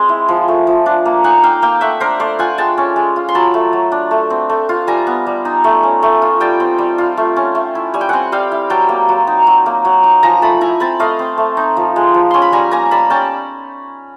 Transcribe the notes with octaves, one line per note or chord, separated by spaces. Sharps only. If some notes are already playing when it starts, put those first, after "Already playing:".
Already playing: G#3 C4
E4
F3
A3
F3
D4
A#3
D#4 F#5 G#5
D#4 F5 G5
A#3 F5 G5
A3 E5 F#5
D4 A#4 C5
A3 C5 D5
F4 F#5 G#5
G#3 G5 A5
C#4
G#3
F4
C6
F#3 A5 B5
A3
F#3
D4
A3
C4
A3
F4
G3 G#5 A#5
B3
G3
D#4
A3
C#4
A3
F4
G3 G5 A5
C4
G3
F4
A3
C#4
A3
E4
G3 G#5
G5
C4 F#5 G#5
G3 F5 G5
E4
F#3 G5 A5
A#3
F#3
D#4
F#3
A#3
F#3
D#4
F3 G#5 A#5
A3 A5 B5
E4 G#5 A#5
C4 A5 B5
A3 D#5 F5
C4
A3
D#4
F3
G#3
F3
C#4 C6
B5
G3 G#5 A#5
A#3 G#5 A#5
G3 A5 B5
C#4 G5 A5